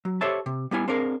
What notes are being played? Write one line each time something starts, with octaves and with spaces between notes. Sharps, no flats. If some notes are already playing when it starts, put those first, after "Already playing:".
F#3
G4 A4 C5 C#5 E5 A5
C3
G3 B3 E4 G#5
C4 D4 G#4 A#4 F5